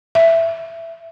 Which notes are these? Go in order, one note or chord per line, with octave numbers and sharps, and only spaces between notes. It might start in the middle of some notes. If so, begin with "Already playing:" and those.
E5